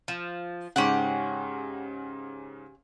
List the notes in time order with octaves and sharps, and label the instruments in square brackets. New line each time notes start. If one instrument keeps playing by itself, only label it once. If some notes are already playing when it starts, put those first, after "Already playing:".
[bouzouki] F3
[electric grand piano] G#2 C#3 [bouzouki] C#4 G4 F#5